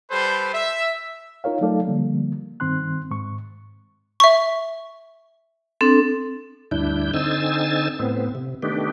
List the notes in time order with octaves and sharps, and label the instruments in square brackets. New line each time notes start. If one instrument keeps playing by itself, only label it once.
[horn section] G3 A4 B4 C5
E5
[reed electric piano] D#4 F4 A#4 C#5 F5
F#3 A3 D#4 A4 D5 F5
D3 F3 G3 A#3
G2 D#3 C4 C6 F#6
G#2 C#6
[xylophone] E5 C#6
[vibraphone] C4 D4 A4
[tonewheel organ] D2 G2 D4 E4 G6
D3 C4 D#4 G#5 E6 A6
A2 B3 C4
C3
D#3 A3 B3 D4 G4